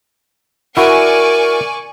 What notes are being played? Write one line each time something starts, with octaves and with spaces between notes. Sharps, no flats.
E4 F#4 A#4 D5 G#5 C#6